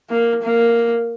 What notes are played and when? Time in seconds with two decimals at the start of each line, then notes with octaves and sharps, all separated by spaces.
0.09 A#3
0.43 A#3